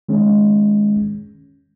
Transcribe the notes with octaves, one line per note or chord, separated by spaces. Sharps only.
D#3 G#3 C#4